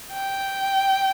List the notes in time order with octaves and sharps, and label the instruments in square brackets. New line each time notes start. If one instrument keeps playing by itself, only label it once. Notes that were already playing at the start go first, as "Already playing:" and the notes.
[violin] G5